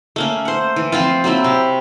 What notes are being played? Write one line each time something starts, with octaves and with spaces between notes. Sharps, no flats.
A3 A#3 C#4
C5 F#5
E3
F3 C4 F4
F#3 A#3 C4 E4
C3